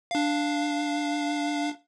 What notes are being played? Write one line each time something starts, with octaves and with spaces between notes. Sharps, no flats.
D4 F5